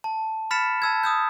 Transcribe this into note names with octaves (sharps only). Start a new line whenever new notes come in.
A5
B5 F6 A6 B6 C#7 E7
A5 E6 G#6
D#6 E6 G6